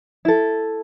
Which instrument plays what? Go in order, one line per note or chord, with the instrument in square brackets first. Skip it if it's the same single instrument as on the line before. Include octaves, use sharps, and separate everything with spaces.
[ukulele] E4 A4